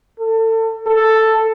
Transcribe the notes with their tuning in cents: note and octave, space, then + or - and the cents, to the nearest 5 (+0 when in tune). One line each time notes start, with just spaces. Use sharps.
A4 +30
A4 +5